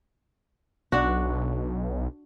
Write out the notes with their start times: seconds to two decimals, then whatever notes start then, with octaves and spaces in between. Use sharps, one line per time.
0.92 B1 D4 F#4